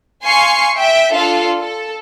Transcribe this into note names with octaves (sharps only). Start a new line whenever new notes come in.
F5 G#5 C6 C#6 C7 C#7
E5 G5
D4 F4 A4 F5
A4